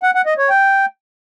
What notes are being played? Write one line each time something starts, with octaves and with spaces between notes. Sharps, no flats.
F#5
F#5
D#5
C#5
G5